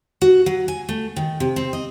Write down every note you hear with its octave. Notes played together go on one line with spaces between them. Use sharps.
F#4
F#3
G#5
A3
D#3
C3
C4
D#5